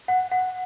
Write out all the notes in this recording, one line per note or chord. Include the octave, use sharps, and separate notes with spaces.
F#5
F#5